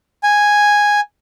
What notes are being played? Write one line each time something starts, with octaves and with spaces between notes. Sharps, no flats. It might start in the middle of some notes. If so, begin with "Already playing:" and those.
G#5